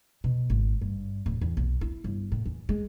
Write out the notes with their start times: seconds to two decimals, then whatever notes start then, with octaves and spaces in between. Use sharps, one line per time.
0.24 B2
0.50 G#1
0.81 G2
1.26 D1
1.41 E2
1.57 B1
1.81 E4
2.04 G1
2.32 A2
2.46 E2
2.69 G#3